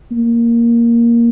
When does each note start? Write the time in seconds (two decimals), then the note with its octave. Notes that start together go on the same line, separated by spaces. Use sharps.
0.11 A#3